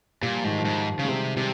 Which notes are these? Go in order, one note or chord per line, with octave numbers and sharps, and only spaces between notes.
A#2 G3
F3
G#2 D#3
F3
G#2
C#3
G#3
C3 G3
C3 G3